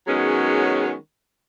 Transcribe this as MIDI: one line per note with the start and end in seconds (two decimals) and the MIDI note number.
0.07 0.94 51
0.07 0.94 54
0.07 0.94 56
0.07 0.94 59
0.07 0.94 61
0.07 0.94 68